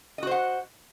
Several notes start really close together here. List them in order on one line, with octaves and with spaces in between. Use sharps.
D#5 F#4 C5 F#5